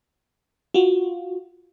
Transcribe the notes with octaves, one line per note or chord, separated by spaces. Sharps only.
F4 F#4